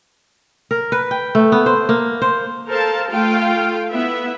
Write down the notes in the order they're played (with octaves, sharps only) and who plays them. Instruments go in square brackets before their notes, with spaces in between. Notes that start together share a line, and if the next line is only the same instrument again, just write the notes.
[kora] A#4
B4
G5
A3
B3
C5
A#3
C5
[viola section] A4 A#4 C5 F5 A5
A3 F4 A4 F5 G5
B3 E4 E5